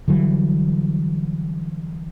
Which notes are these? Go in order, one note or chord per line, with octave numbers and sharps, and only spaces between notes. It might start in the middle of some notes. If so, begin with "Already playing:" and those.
D3 E3 F#3 G3